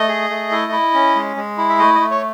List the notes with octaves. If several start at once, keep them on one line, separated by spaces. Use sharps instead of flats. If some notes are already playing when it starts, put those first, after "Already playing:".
Already playing: A3 D#5
G#4
A3
E4
E4
C#4
G#3
G#3
E4
E5
A3 D#5
D#5
A3
C#5